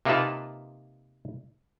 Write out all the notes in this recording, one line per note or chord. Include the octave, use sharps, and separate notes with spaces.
C3 A#3 D#4 F4 B4 A5